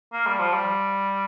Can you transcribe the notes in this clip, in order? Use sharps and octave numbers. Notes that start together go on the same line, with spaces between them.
A#3
G3
F3
G3